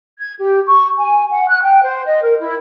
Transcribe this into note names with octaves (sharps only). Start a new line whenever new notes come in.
G#6
G4
C#6
G#5
F#5
F#6
G5
C5
D#5
A#4
E4